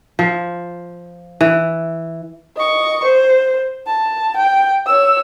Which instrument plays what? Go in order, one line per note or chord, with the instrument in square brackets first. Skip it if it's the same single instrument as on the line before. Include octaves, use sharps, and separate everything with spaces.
[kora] F3
E3
[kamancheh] D#5 C#6
C5
A5
G5
C#5 E6